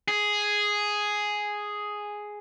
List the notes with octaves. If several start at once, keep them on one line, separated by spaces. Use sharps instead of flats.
G#4